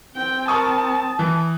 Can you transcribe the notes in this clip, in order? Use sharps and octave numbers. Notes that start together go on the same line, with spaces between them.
C4 G5
A#4 A5 C#6 D#6
E3